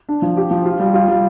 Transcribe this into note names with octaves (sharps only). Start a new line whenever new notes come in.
D4
F3
G4
F3
F4
G3
F4
G3